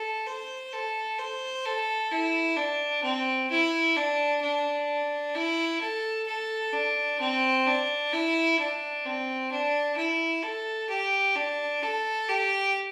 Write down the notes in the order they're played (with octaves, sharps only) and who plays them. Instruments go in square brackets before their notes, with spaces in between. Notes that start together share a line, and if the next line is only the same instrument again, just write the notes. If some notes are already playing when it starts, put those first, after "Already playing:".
Already playing: [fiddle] A4
C5
A4
C5
A4
E4
D4
C4
E4
D4
D4
E4
A4
A4
D4
C4
D4
E4
D4
C4
D4
E4
A4
G4
D4
A4
G4